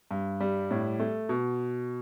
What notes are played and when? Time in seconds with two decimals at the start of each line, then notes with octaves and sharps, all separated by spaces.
0.11 G2
0.40 G3
0.71 A2
1.00 A3
1.29 B2